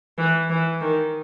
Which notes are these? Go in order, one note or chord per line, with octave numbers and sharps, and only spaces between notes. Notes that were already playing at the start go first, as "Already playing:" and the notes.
E3
E3
D#3